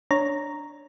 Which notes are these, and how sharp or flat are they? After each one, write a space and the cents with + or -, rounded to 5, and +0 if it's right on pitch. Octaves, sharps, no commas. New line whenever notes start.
D4 +0 C#5 +0 A#5 +0